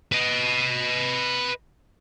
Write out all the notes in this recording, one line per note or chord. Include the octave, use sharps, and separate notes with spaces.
B4 D#5